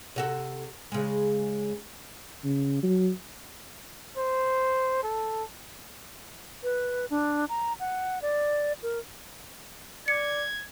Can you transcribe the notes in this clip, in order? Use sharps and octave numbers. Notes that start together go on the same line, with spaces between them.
C3 F#4 A4
C#3 G#3
C#3
F#3
C5
A4
B4
D4
A#5
F#5
D5
A#4
D5 G#6 C#7